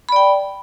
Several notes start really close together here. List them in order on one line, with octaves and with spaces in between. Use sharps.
B5 D5 G5